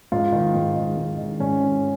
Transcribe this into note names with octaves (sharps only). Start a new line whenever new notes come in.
G#2 F4
D#3
G#2
D#3
G#2
D#3
G#2 C#4
D#3